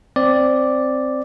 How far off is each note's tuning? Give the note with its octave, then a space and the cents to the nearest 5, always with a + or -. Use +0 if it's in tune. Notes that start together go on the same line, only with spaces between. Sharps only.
C4 +0 D5 +0